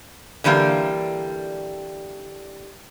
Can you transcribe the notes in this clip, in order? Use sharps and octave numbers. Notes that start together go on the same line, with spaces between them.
D3 E3 G3 A#3